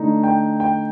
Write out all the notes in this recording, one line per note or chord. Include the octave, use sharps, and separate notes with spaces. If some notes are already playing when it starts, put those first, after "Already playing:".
Already playing: D3 A3 D#4
G5
G5